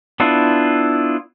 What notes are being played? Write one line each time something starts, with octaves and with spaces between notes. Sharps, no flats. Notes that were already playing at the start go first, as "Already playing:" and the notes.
B3 D4 E4 F4